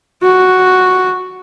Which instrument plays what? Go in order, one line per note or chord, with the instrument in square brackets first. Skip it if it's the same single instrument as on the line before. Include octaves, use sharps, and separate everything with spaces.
[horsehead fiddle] F#4